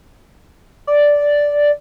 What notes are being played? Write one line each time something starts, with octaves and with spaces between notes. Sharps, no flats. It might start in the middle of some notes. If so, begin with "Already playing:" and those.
D5